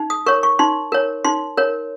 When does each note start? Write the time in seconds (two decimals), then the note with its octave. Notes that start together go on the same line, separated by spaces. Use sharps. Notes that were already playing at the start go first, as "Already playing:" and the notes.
Already playing: D#4
0.10 D#6
0.26 A#4 C#5 C#6
0.43 C#6
0.59 D#4 C6
0.92 A#4 C#5
1.25 D#4 C6
1.57 A#4 C#5